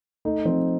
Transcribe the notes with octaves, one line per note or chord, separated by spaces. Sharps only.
A3 D#4
F3 C4